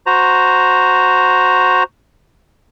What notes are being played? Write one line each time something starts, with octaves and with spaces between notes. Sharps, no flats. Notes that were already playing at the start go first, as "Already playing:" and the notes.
F#4 C5 A#5